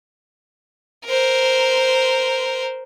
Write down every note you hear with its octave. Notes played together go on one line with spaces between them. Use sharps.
A#4 C5